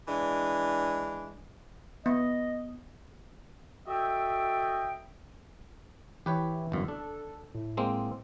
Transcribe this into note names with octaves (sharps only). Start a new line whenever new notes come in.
E3 G#3 D4
B3 D#5
F#4 A4 D#5 E5 G5
E3 G4 B4 C#5
G1 F#2
D4 A4
A2
G#3 A#3 C4